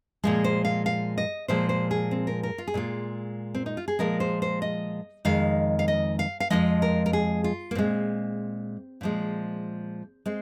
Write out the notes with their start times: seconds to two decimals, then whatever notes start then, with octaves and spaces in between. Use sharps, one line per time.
0.24 A#2 F3 G#3 G#4
0.44 C5
0.65 F5
0.86 F5
1.18 D#5
1.48 A#2 F3 G#3 C5
1.69 C5
1.91 G#4
2.11 C4
2.27 A#4
2.43 A#4
2.58 F4
2.67 G#4
2.74 A#2 G#3 F4
3.55 C4
3.66 D#4
3.77 F4
3.88 G#4
3.99 A#2 F3 G#3 A#4
4.20 C5
4.42 C5
4.62 D#5
5.25 F2 D#3 G#3 F5
5.79 F5
5.88 D#5
6.19 F5
6.40 F5
6.50 F2 C3 F3 G#3 D#5
6.82 A#4
7.06 A#4
7.13 G#4
7.44 F4
7.71 A#3
7.75 A#2 G#3 C4
9.01 A#2 F3 G#3
10.26 G#3 C4